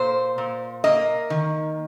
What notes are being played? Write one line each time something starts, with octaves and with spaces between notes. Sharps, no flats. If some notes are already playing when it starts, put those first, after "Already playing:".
Already playing: A#2 C5
A#2
A#3 D#5
D#3